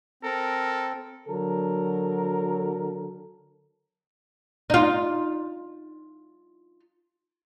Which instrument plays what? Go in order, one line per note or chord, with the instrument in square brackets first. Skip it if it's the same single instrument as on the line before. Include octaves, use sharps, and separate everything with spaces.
[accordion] C4 [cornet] A4 [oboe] A#4
[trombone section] D3 F#3 A4 A#4
[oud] D#4 F4